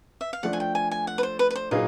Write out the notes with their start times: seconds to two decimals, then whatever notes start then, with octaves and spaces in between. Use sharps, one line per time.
0.21 E5
0.33 F5
0.43 F3 A3 D4 F#5
0.53 G#5
0.60 G5
0.75 G#5
0.91 G#5
1.07 F#5
1.18 B4
1.23 C5
1.39 B4
1.50 B4
1.55 C5
1.71 A#2 F#3 A#3 D#4 G#4 B4